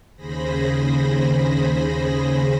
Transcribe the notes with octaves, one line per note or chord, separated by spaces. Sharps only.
D#2 C#3 G#4 C5 B5 A#6